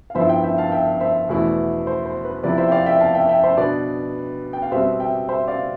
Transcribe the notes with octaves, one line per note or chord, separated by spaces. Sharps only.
F5
G2 F3 B3 E4 C5 E5
E5 G5
E5 G5
F5 A5
E5 G5
C5 E5
E2 B2 A3 E4
C5
C5
B4
C3 F3 B3 E4 B4 D5
C5 E5
G5
D5 F5
E5 G5
F5 A5
E5 G5
E5 G5
C5 E5
B2 B3 D4 B4 D5
G5
F5
B2 G3 C4 C5 E5
E5 G5
C5 E5
D5 F5